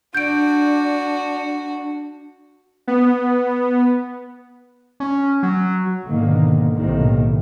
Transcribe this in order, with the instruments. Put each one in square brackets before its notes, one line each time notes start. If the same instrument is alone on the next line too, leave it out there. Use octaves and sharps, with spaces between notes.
[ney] D4 [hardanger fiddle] F#4 [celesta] G6 D7
[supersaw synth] B3
[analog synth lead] C#4
F#3
[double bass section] G#2 B2 D3 D#3 A#3
B1 A2 C3 D#3 A#3